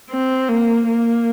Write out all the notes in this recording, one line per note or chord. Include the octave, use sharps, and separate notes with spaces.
C4
A#3
A#3